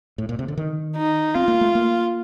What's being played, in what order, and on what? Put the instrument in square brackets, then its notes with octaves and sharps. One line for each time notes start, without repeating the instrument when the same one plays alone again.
[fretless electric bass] A2
A#2
C3
D3
D#3
[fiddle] D#4
[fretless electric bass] C4 [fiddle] F4
[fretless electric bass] A#3
A3
A#3